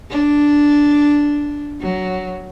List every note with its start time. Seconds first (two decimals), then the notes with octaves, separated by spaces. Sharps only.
0.10 D4
1.81 F#3